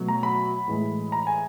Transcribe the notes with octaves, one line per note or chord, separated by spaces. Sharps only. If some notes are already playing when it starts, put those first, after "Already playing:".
Already playing: B2 F#3 A3
A#5
B5
A2 E3 G#3
A#5
G#5